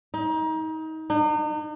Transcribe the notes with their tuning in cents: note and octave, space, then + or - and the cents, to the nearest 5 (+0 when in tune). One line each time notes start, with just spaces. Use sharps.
D#4 +30
D#4 -40